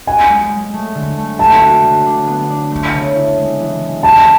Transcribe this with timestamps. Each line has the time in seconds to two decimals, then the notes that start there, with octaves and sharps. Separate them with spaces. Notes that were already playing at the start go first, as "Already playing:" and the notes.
0.07 F#4 G#5
0.29 G#3
0.51 G#3
0.73 A3
0.95 D3
1.18 A3
1.39 A3 A5
1.61 F#4
1.84 D3
2.06 D4
2.27 B3
2.50 D4
2.71 A3
2.94 C#3
3.16 E4
3.38 G#3
3.60 E3
3.82 G#3
4.03 A3 A5